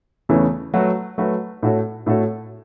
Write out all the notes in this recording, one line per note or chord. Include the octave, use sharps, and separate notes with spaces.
E2 C#3 E3 A3 C#4
F#3 A3 F#4 B4
F#3 A3 F#4 B4
A2 A3 F#4 A4 C#5
A2 A3 F#4 A4 C#5